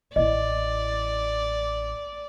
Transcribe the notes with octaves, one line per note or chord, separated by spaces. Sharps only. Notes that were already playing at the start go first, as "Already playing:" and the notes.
A1 E4 D5 D#5